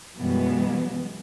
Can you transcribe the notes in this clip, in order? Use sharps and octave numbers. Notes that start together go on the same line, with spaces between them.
F#2 B2 E3 G3 G#3 B3